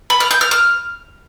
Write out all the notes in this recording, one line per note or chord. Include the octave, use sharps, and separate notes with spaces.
B5
F6
G6
F6
F6